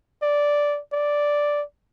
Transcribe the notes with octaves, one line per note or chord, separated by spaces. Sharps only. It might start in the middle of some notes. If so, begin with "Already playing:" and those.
D5
D5